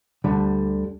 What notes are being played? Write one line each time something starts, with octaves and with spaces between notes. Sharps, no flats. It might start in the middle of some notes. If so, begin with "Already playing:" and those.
D2 D3 G3